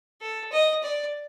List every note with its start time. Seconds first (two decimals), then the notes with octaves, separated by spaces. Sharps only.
0.22 A4
0.52 D#5
0.83 D5